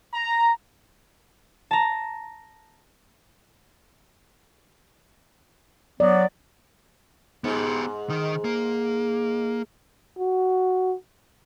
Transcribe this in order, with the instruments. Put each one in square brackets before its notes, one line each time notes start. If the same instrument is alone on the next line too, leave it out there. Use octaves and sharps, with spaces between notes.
[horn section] A#5
[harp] A5 A#5
[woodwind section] F#3 B3 [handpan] D5
[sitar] G#2 [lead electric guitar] B3 G4
[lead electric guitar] D#3 D#4
A#3
[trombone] F#4